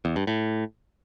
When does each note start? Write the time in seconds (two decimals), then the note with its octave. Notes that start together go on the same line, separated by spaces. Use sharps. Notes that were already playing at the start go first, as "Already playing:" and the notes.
0.05 E2
0.16 G2
0.27 A2